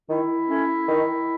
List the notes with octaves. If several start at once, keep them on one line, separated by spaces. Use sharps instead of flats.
D#3 E4
A3 C#4
D#3